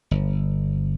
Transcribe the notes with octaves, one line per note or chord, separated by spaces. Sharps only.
G1